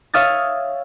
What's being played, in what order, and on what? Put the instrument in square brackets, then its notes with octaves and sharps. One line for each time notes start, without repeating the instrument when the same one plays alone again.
[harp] C#5 E5 F5 D#6 G#6 A6